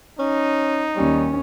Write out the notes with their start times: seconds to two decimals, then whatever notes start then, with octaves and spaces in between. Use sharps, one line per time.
0.19 C#4 D#4
0.96 D#2 G3 C#4